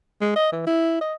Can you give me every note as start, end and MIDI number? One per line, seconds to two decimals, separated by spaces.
0.21 0.36 56
0.36 0.51 75
0.52 0.63 52
0.67 1.01 64
1.01 1.14 75